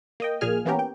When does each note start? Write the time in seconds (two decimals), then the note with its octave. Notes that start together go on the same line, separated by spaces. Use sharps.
0.20 A#3 D#5 G5
0.41 A#1 A#2 A#3 G#4 G#5 F6
0.65 E3 A#3 B3 C#4 G4 A#4
0.79 G5